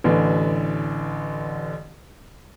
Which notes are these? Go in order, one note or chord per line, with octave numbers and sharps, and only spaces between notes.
A1 D3 E3